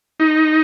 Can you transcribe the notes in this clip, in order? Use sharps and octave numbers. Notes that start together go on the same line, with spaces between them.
D#4